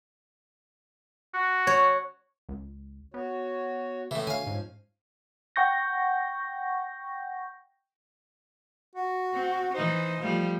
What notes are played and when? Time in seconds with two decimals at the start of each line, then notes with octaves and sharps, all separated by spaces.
1.34 F#4
1.67 C#5
2.49 C#2
3.14 B3 F#4 C#5
4.11 A2 C#3 E3
4.27 B2 D3 C#5 F5 G#5
4.47 G#2 F3 C#4
5.56 F#5 G5 C#6 G6 A#6
8.95 F#4
9.34 C4
9.74 E3 D#4 C5
10.21 F3 G3 A3